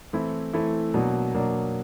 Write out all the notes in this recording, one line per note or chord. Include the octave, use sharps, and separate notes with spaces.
E3 A3 C4 E4
E3 A3 C4 E4
B2 F#3 A#3 D4
B2 F#3 A#3 D4